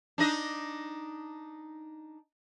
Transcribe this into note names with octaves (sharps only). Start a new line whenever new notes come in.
D4 D#4 D#5